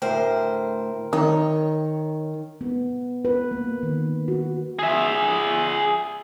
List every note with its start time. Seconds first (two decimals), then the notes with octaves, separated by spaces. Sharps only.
0.02 D2 A2 A#4 C5 G5
1.13 D#3 C#5
2.61 B3
3.25 B4
3.51 A#3
3.83 D#3
4.28 F#4
4.79 G#4 E5